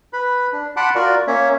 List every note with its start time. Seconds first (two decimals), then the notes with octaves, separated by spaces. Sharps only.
0.13 B4 B5
0.53 D4
0.77 F#5 A5 B5 C6 D6 F#6
0.95 F4 F#4 A#4 D5
1.27 A#3 C#4 C#5 E5